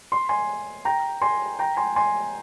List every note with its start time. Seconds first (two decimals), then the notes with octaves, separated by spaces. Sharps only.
0.12 C6
0.29 G#5 C6
0.85 G5 A#5
1.21 G#5 C6
1.59 G5 A#5
1.77 G#5 C6
1.96 G#5 C6